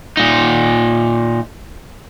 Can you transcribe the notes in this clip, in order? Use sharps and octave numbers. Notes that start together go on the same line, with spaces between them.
A#2 D#4